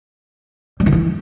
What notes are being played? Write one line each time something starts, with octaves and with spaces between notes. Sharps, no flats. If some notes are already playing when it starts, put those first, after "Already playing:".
G3
D#3
E3